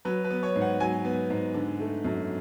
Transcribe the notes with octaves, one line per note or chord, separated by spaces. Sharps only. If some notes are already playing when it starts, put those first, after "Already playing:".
F#3 B4
B4
B3
C#5
G#2
F#5
F#3 G#5
B3
G#2
D3
A3
F#2